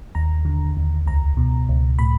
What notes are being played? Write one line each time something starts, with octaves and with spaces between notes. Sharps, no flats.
D#2 A#5
D3
D#2
C#2 A#5
B2
C#2
A2 B5